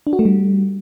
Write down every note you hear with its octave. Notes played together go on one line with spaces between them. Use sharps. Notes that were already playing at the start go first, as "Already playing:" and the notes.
D4
F#4
A3
G3